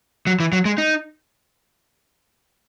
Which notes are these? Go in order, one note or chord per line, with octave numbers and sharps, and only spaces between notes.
F#3
E3
F#3
G#3
D#4